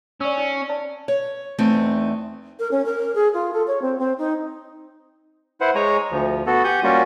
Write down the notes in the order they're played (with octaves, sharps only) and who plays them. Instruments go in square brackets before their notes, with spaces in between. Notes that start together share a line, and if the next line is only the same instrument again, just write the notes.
[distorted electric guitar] C#4 [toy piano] D5 E6
[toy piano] D#4
D5 A5
[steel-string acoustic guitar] C#5
E2 A3 C4 D#4 G#5
[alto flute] A#4
C#4
A#4
G#4
F4
A4
C#5
C4
C4
D#4
[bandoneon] E4 B4 C5 F#5
G#3 C#5 G#5 A#5
D2 F3
B3 F#4 A4
G4 F#5 G#5 G6
G3 A#3 C#4 F4 F#4